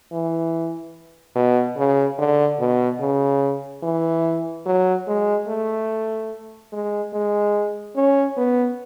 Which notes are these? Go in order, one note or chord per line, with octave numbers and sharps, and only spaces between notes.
E3
B2
C#3
D3
B2
C#3
E3
F#3
G#3
A3
G#3
G#3
C#4
B3